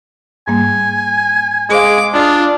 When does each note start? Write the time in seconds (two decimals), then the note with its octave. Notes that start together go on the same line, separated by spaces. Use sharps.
0.48 G#2 G3 A#3 G#5
1.70 G#3 G#4 C5 F5 D6
2.14 D4 F4 D6 D#6